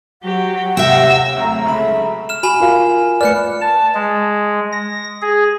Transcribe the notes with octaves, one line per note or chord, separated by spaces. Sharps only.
F#3 G4 F#5
D#2 C3 E5 G5 E6 A#6
G#1 F#3 A3 A#5
C#2 C#3 E5 B5
F6 E7
F#4 G#5 B5
F4 A#4 F5
A3 B4 D5 F6 F#6 C#7
A5
G#3
A#6
G#4